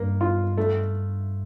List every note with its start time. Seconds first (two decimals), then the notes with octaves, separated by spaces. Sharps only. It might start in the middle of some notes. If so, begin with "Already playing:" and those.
Already playing: G2 A#3
0.21 F4
0.57 A3